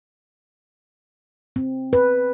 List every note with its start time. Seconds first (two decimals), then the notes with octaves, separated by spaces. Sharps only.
1.56 C4
1.93 B4